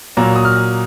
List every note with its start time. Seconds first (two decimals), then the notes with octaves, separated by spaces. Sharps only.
0.17 A#2 F#3 A#3 A#5
0.36 D#6
0.45 F6